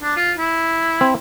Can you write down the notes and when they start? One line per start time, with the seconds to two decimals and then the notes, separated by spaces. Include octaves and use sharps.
0.02 D4
0.16 F4
0.37 E4
1.01 C4